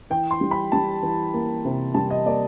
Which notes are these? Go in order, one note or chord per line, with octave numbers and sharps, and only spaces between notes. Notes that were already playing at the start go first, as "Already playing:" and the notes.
E3 G5
C6
G3
B5
G3 A5
E3
A#3
C3
G3 A5
D#5
A#3 D5